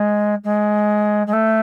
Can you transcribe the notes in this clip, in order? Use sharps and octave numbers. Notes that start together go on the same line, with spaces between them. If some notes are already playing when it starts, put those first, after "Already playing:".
Already playing: G#3
G#3
G#3
A3